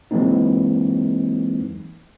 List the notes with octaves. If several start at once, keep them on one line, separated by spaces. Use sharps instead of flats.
E3 F#3 G#3 A#3 C4 D#4